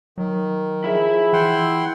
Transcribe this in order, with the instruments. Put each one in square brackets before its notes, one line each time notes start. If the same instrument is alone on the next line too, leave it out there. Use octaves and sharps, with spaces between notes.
[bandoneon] D#3 [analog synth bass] F#3
[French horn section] F3 G#4 [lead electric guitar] E4 E5
[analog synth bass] E3 [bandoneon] F#5 G5 C6